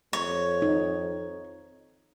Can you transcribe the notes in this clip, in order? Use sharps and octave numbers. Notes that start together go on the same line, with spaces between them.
F2 C#5
D#4